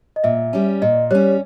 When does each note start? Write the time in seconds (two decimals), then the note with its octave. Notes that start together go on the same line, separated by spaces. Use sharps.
0.16 D#5
0.24 A#2 E5
0.53 G3 C#4
0.82 A#2 D#5
1.11 G3 C#4 C#5